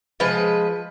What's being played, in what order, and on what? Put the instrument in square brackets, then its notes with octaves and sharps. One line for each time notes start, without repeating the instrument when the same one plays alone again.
[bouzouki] F3 G#3 B4